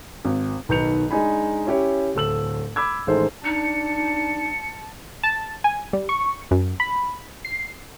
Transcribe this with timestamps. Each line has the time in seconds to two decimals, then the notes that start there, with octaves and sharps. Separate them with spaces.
0.25 G#1
0.69 B1 D#3 B4 G6 C#7 F7
1.11 G#3 D4 D#4 G#5 B5
1.67 C#4 E4 G4 C#5
2.15 D1 A4 E6 F#7
2.76 B5 D6 E6 G#6
3.07 A1 A2 D#3 G#3 A4 C5
3.45 D4 D#4 A5 C#7
5.23 A5
5.64 G#5
5.93 G3
6.09 C#6
6.51 F#2
6.80 B5
7.45 C7